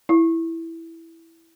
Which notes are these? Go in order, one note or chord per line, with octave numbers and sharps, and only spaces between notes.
E4